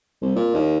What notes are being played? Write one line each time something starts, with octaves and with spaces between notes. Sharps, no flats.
C2
A#2
D#2